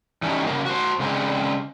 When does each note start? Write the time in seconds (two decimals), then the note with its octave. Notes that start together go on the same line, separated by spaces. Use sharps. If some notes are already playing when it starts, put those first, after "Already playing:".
0.22 E3 F#3 G3 A3 C#4 D#4
0.46 C#3 A#3
0.65 F#4 C5
0.99 C#3 G#3 C4 D4